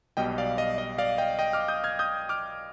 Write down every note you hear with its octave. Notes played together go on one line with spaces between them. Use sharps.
B1 B2 G3 D#5 G5
D5 F5
D#5
D#5
D5 F5
D#5 G5
D#5 G5
D6 F6
D#6 G6
F6 G#6
D#6 G6
D6 F6